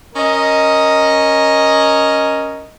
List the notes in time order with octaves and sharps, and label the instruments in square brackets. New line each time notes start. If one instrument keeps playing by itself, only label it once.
[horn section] C#4 A#4 D#5